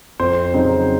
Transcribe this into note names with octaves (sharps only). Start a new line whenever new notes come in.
F2 C5
C#3 F#3 C4 D#4